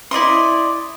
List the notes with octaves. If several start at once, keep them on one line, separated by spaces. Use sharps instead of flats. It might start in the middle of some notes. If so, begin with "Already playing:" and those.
E4 D5 D#5 C6